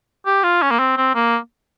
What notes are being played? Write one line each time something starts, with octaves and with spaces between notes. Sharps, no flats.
G4
F4
C#4
A#3
C4
C4
A#3